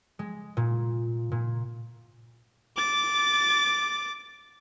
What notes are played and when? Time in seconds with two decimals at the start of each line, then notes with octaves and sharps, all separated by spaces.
0.19 G#3
0.57 A#2
1.32 A#2
2.77 D6 A6